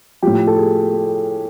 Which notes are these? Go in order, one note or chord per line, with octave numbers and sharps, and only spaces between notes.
A2 F3 G4
A4
G#4